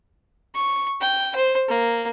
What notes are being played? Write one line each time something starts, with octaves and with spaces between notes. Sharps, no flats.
C#6
G5
C5
A#3